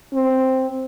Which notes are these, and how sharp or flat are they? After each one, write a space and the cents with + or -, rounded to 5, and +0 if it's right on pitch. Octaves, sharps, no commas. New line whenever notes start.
C4 +0